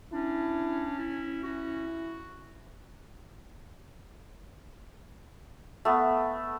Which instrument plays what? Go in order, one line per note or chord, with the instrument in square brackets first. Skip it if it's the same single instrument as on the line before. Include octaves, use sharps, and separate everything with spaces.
[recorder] C#4 [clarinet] D4 [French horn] E4
[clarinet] E4
[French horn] E4 [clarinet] F#4
[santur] A3 B3